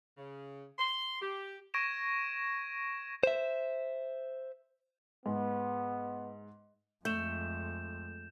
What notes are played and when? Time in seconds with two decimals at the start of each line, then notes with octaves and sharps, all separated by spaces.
0.18 C#3
0.79 C6
1.21 G4
1.74 C#6 G#6 A#6 D7 E7
3.23 C5 E5
5.26 G#2 B3
7.05 F2 G#3 A3 G6 E7